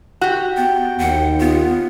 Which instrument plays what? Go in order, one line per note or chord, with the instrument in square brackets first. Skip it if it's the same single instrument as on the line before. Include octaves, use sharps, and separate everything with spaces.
[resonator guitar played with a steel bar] F#4 G4
[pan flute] B3 [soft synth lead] G5
[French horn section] D#2 [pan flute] F#5
[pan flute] B3 [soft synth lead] F4